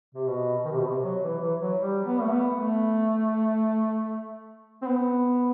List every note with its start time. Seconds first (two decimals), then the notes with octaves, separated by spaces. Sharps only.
0.15 C3
0.27 B2
0.65 D#3
0.72 C3
0.79 B2
0.86 C3
1.03 F#3
1.23 E3
1.41 E3
1.61 F#3
1.80 G3
2.05 B3
2.21 A3
2.31 B3
2.56 A3
4.82 C4
4.86 B3